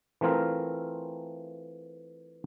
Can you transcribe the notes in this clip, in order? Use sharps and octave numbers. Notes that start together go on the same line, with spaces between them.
E3 A3 C4 F4 A#4 F5